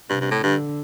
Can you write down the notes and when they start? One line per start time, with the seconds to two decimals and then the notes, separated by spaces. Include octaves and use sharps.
0.09 G2 C3
0.21 G2
0.31 A2
0.43 G2 D3